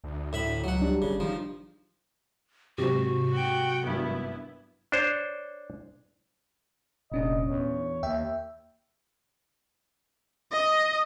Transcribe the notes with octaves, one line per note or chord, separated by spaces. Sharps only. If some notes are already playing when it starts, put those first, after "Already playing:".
D2
A2 E5 B5
C#2 F#3 F#5
G3 D4 G4
G1 C#3
D#3 F3
G#2 C3 F#3 F#4 G4 C5
F#5 G5
G#1 G2 B3 E4
D4 C5 C#5
F1 A#2 C#4 D4 D#5
E2 C#5
D#2 E5 G5
D#5